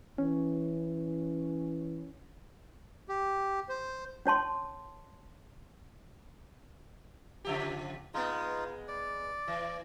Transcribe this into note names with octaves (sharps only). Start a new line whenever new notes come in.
E3 C#4
G4
C5
C#4 C#5 A5 C6
C#3 F3 G4
G#3 B3 D#4 F4
D5
E3